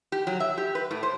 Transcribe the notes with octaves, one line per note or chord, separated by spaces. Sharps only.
G4
F#3
E5
G4
B4
A2
C5